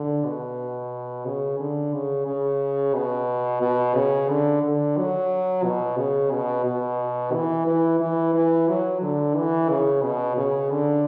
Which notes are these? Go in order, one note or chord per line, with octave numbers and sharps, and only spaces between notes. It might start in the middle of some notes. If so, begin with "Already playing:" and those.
Already playing: D3
B2
C#3
D3
C#3
C#3
B2
B2
C#3
D3
D3
F#3
B2
C#3
B2
B2
E3
E3
E3
E3
F#3
D3
E3
C#3
B2
C#3
D3